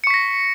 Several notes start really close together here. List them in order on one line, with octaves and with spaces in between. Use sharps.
C#7 C#6 B6 A#6